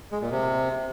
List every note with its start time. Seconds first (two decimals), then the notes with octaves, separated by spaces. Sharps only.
0.12 G#3
0.22 A#2
0.32 C3